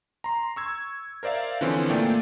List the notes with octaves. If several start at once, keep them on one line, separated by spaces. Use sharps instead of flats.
A#5 C6
C#6 E6 G#6
A#4 C5 D5 E5 F5
D3 E3 F3 C4 C#4
A#2 A3 A#3 D5 G5